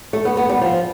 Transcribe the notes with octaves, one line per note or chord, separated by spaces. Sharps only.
A3
B3
B3
G3
F3